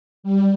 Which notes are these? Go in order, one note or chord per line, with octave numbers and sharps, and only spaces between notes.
G3